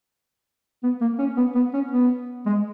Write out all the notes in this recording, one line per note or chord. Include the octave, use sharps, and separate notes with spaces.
B3
A#3
C#4
B3
B3
C#4
B3
G#3